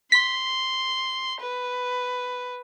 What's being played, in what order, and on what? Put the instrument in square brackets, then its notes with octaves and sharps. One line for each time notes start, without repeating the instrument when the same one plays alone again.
[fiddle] C6 [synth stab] B6
[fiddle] B4